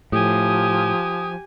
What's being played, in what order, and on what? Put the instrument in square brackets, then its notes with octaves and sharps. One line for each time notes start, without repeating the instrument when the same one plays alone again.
[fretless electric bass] A2 [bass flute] F3 [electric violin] G4 G#5 [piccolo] D#6